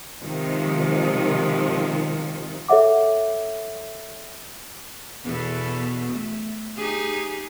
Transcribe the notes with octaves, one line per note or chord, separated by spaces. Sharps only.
C3 D#3 F3 G#3
A4 C#5 E5 F#5 D6
E2 B2 A4
A3
D#4 G4 G#4